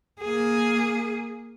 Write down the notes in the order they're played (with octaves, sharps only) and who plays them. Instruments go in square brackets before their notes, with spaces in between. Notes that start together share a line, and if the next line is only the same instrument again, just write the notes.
[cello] A#3 G#4